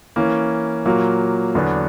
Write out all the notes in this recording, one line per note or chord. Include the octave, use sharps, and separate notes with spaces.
E3 A#3 C#4
A#2 F#3 A#3
E2 D3 F#3 B3 D4